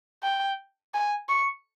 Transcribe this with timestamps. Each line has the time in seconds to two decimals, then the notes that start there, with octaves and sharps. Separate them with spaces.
0.23 G5
0.94 G#5
1.29 C#6